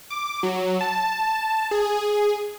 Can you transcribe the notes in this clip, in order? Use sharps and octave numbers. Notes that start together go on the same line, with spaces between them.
D6
F#3
A5
G#4